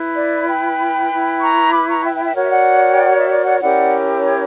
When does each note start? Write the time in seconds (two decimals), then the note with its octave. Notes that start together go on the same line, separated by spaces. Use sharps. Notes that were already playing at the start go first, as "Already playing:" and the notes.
Already playing: E4 B4
0.15 D5
0.47 G5 B5
1.10 E4 B4
1.41 A#5 C#6
1.73 B5 D6
1.88 A#5 C#6
2.04 E5 G5
2.14 E5 G5
2.25 E5 G5
2.35 F#4 A#4 C#5 F#5
2.43 E5
2.51 D5 F#5
2.92 G5
3.05 F#5
3.17 E5
3.30 D5
3.46 D5 F#5
3.61 C#4 E4 G4 A#4 D5 F#5
4.24 C#5